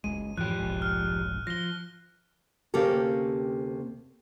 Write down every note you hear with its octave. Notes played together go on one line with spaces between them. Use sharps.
F#1 C#2 G#3 D#7
F2 G#2 E3 F3 G4 F#6
F1 B1 G#2
F6
F3 A#6 G7
D2 C3 A#3 C#4 G4 A4